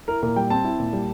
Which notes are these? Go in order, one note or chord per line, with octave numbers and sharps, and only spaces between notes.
E4 A#4
A#2 A#4
G3 G5
C4 A5
E4
A#2
G3